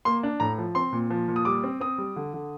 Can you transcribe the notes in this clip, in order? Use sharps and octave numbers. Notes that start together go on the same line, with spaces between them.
A#3 C6
D4
A2 A#5
F3
C4 C6
A#2
F3
A#2
D#6
G3 D6
C4
C4 D#6
G3
D3
D3